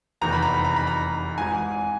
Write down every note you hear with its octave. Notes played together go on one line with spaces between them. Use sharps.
F1 E2 C3 D#3 A#5
B5
A#5
B5
A#5
B5
A#5
G#1 G#2 E3 G#5